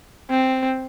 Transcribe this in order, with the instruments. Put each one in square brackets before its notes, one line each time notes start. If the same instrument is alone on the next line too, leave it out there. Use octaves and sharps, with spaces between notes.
[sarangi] C4